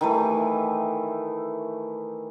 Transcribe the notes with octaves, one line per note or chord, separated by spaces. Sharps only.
D#3 E3 A3